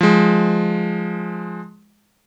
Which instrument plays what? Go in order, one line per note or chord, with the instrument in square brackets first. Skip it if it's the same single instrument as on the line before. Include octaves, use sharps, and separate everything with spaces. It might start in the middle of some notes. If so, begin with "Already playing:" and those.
[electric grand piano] F3 G#3